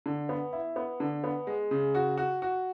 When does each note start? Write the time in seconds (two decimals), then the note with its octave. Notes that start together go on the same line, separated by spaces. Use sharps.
0.06 D3
0.29 B3
0.53 E4
0.76 B3
1.00 D3
1.24 B3
1.47 G#3
1.71 C#3
1.95 F#4
2.18 F#4
2.42 F#4